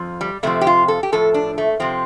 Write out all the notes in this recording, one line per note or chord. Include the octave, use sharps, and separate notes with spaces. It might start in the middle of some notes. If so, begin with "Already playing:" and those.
Already playing: F2 F3
G3
F2 C3 F3 A3
G4
F4
A4
G4
A2 F3 A4
D4
A3
C3 F3 C4